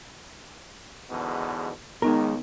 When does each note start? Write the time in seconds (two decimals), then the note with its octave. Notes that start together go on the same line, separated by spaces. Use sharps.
1.10 E2 G#2 B2 D3
2.02 C#2 D#3 G#3 B3 D#4 A#4